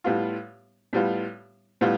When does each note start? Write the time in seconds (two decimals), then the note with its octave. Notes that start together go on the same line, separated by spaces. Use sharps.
0.04 A2 G3 B3 F4
0.93 A2 G3 B3 F4
1.81 A2 G3 B3 F4